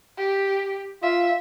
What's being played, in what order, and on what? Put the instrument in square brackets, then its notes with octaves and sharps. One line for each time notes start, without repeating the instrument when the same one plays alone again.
[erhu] G4
[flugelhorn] F4 [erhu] E5